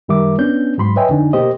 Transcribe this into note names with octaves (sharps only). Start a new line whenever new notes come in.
F#2 D#3 G3 A#4 E5 D6
B3 C#4 D4 G6
G#2 F#3 B5 C6
B4 C#5 D#5 E5 G5 G#5
F2 D3 D4 D#4 G#5
B2 A#3 G4 C5 D#5